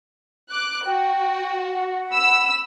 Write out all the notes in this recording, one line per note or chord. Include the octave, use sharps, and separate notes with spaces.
D6 F#6
F#4 G5
F#5
B5 E6